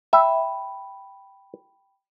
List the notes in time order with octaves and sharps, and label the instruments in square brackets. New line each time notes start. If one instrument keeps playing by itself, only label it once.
[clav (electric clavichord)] E5 [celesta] G5 B5